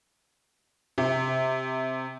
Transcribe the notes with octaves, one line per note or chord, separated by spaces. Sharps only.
C3